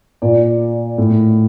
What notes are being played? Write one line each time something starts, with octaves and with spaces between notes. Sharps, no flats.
A#2 D5
A2